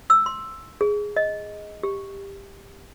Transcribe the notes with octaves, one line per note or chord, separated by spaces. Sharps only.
E6
C6
G#4
D#5
G4